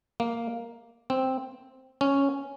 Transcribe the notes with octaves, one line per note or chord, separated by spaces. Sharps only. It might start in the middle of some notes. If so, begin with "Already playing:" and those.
A#3
C4
C#4